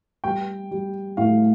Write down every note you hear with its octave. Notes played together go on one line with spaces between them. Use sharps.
G3 G5
G3
A2 F5